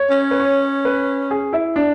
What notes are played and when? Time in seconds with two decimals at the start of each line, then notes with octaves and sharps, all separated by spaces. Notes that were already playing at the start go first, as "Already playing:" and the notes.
Already playing: C#5
0.10 C#4
0.31 B4
0.40 C#5
0.85 B4
1.31 G#4
1.53 E4
1.76 D4